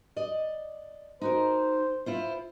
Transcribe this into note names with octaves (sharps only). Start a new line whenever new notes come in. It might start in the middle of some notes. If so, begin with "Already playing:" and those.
D5 D#5
D#4 F#4 A#4 C5
E4 F4 C5